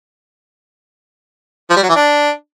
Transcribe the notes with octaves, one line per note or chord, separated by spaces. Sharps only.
F3
G3
F#3
E3
D4